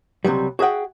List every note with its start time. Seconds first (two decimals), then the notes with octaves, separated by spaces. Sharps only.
0.25 C#2 C3 E3 F#3 G3
0.59 F#4 G#4 E5 F#5 G5